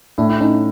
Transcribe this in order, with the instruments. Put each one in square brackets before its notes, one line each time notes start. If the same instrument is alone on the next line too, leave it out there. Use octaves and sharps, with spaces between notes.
[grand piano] A2 [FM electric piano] D4 E4
[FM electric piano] E4
C#4 D#4